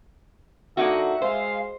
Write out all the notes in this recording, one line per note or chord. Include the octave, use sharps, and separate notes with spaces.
D3 A#3 D#4 F#4 E5 F#5
G#3 C5 F5